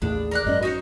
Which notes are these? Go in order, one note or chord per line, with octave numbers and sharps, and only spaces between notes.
A1 D#2 A2 D4 G#4
A#4 D5 F#6
G#1 F#2 C#4 D#5
D#4 F#4 C5 C#5